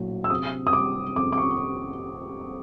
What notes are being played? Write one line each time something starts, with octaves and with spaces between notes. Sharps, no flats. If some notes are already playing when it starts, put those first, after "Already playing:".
Already playing: A#1 A2 F#3
E6
C3 D#6
D#6
G3 D6
F2 D6
D6
C#6